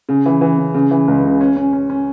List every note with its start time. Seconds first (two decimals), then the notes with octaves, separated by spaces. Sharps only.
0.09 C#3
0.26 E3
0.41 E3
0.58 C#3
0.74 C#3
0.91 E3
1.08 C#2
1.24 C#3
1.41 C#4
1.56 C#4
1.73 C#4
1.90 C#4